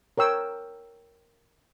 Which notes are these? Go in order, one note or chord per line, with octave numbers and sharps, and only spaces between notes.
A#4 C#5 G5 E6